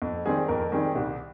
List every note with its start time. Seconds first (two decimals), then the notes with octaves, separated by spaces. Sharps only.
0.02 F2
0.26 D#3 G3 C4 G#4
0.48 F2 A#4
0.72 D#3 G3 C4 G#4
0.95 C2 G4